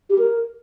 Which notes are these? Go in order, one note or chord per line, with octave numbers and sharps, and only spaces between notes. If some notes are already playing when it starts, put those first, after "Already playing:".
G4
A#4